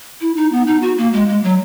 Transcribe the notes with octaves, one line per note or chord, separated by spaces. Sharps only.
E4
D#4
B3
D#4
F#4
A#3
G#3
G#3
F#3